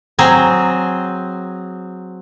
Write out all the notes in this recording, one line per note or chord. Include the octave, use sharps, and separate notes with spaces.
F#3 C4 G#4 C5 A#5